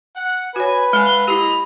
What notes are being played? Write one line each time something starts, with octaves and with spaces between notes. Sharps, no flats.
F#5
F#4 B4 C#5 G#5
G#3 A4 F5 F#5 G#5 G7
A#3 E4 G4 D#5 B5 F7